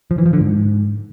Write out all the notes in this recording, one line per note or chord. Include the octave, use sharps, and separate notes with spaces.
F3
E3
F3
D3
G#2